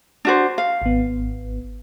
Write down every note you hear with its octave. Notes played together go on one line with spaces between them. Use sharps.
D4 F#4 C5
F5
G#1 B3